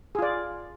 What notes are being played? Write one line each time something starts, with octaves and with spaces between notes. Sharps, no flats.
F4 G#4 D5